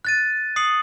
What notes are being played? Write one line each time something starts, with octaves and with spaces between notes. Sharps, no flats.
F#6 A6 D#7
D#6 C7 C#7 F#7